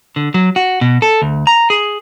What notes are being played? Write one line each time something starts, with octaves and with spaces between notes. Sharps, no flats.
D3
F#3
F#4
B2
A4
D2
A#5
G#4